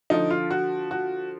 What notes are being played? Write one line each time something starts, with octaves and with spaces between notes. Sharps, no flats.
D3 F3 D#4
F4
F#4
F#4